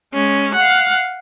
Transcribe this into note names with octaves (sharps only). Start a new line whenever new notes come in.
G#3 C#4
F5 F#5